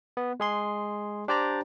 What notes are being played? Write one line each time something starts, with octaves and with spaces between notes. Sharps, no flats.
B3
G#3 G#4 C6
D4 G4 C5 D5 G5 A#5